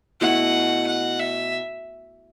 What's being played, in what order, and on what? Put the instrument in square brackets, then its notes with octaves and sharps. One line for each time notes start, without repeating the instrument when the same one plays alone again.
[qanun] B2 A3 E4 [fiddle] F#5
[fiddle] F#5
E5